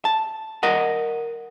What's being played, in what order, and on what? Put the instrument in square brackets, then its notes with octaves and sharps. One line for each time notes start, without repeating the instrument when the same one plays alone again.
[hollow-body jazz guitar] A5
A#4 D#5 F#5